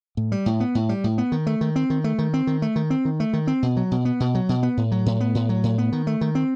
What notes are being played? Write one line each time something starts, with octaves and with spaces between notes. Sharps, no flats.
A2
G3
A2
B3
A2
G3
A2
B3
D#3
A3
D#3
C4
D#3
A3
D#3
C4
D#3
A3
D#3
C4
D#3
A3
D#3
C4
B2
F#3
B2
B3
B2
F#3
B2
B3
A2
F#3
A2
B3
A2
F#3
A2
B3
D#3
A3
D#3
C4